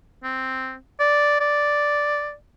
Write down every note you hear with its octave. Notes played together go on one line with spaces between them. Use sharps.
C4
D5
D5